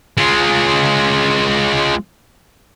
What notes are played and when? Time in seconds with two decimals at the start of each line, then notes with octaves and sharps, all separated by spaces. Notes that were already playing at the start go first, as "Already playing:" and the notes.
0.18 G#3 F4